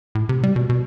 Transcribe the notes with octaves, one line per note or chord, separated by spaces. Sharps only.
A2
C3
G3
B2
B2